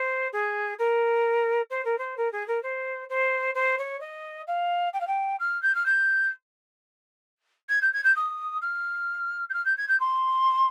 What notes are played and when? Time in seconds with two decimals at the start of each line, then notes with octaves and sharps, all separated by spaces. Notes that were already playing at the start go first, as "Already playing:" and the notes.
Already playing: C5
0.33 G#4
0.79 A#4
1.70 C5
1.85 A#4
1.98 C5
2.17 A#4
2.32 G#4
2.48 A#4
2.63 C5
3.09 C5
3.55 C5
3.78 C#5
4.01 D#5
4.47 F5
4.93 G5
5.01 F5
5.07 G5
5.40 F6
5.62 G6
5.75 F6
5.86 G6
7.69 G#6
7.82 G6
7.93 G#6
8.04 G6
8.16 D#6
8.62 F6
9.50 G6
9.54 F6
9.65 G6
9.77 G#6
9.88 G6
10.00 C6